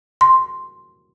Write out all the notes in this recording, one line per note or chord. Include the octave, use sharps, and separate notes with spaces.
C6